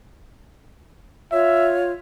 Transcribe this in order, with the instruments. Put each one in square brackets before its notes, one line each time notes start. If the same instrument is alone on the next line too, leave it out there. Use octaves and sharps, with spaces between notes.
[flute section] F4 C#5 [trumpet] E5